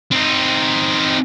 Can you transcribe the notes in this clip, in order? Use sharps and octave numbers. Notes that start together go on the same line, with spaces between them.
C4 D#4